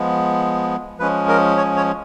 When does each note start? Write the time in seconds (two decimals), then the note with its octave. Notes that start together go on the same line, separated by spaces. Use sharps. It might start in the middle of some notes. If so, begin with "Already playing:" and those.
Already playing: F3 G#3 B3
0.99 F3 G#3 C#4 B4
1.29 A#4
1.57 C#5
1.77 C#5